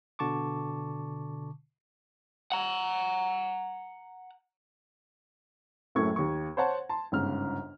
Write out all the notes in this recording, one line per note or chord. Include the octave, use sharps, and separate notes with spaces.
B2 D3 A5 C#6 D6
F#5 A#5
F#1 F#2 A2 A3 C#6 G#6
D#2 C#6
C5 C#5 F#5 A5
A5 C6
G1 G#2 C#3 F6